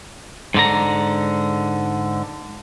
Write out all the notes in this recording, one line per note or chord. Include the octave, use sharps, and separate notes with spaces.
G#2 D3 A#5